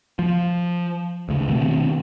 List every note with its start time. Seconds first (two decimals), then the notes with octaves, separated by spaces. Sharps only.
0.19 F3
1.29 D2 C#3
1.48 B2 D#3 A3 C4